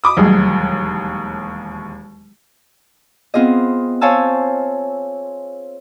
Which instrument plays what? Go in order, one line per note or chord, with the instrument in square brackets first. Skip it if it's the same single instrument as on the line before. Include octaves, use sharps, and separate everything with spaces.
[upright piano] B5 D6 D#6
[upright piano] E1 D#2 G#4 [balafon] F#3 G3 A3
[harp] B3 C4 F4 G#4 D#5
C5 C#5 F5 G#5 A5 E6